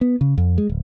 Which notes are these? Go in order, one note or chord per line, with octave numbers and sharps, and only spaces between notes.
B3
C#3
F2
G#3
D1